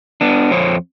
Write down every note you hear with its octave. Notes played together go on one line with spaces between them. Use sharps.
B3 D4
F2 C5 C#5